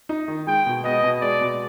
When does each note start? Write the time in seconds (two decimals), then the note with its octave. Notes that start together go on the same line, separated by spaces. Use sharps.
0.09 D#4
0.28 D#3
0.47 G#3 G5
0.66 B2
0.84 B3 D#5
1.03 B2
1.21 G#3 D5
1.41 B2